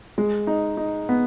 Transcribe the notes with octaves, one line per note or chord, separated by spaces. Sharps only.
G#3
D#4
D#4
B3